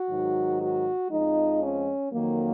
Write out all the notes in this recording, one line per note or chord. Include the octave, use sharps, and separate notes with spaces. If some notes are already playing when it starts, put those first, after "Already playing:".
Already playing: F#4
G#2 D#3 F#3
F#4
F2 F3 G#3 D#4
C#4
F2 D#3 F#3 A#3